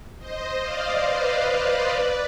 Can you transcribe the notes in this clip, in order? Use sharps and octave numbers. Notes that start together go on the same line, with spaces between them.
C5 D#5
D5 F5
B4 D5
C5 D#5
C5 D#5
B4 D5